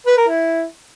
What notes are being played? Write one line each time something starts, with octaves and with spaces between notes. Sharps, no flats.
B4
A#4
E4